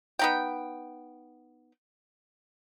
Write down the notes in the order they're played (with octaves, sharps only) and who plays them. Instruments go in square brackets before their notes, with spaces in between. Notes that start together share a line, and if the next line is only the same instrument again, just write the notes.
[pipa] B3 D#4 G5